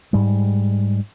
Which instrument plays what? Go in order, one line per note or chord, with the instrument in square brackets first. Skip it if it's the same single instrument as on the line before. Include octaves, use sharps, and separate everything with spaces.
[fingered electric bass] G#2 G3 G#3